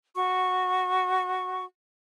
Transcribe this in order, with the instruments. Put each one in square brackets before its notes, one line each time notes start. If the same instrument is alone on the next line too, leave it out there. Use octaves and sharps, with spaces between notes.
[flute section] F#4 C#6